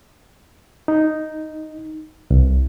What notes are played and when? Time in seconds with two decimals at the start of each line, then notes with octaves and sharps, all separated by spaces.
0.88 D#4
2.31 C2